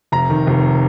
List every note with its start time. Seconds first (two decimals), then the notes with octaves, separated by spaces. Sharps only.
0.12 F1 A#5
0.30 D#3
0.47 F1